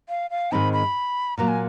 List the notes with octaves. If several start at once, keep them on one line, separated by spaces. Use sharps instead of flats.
F5
F5
G#2 D#3 G#3 C4 D#4 B5
B5
A#2 F#3 A#3 A#5
G#5